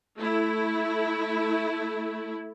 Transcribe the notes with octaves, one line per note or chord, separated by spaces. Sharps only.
A3 E4